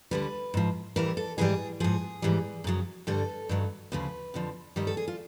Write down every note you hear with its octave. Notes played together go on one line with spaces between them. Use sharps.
D2 D3 G3 B4
G#2 F3
A2 E3 G3 A#4
A4
G#2 E3 G3 G#4
G#2 F3 G#4
G#2 E3 G3
F#2 C#3 F#3
G2 D3 G3 A4
G2 D#3 F#3
D2 C#3 F3 B4
F2 D3 F3
G2 D#3 G3 A#4
A4
G#4
F4